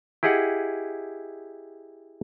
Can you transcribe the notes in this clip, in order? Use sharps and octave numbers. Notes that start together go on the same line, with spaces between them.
E4 G4 G#4 D#5 F#5